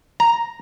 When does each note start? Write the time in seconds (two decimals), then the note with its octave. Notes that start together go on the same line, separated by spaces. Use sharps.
0.20 A#5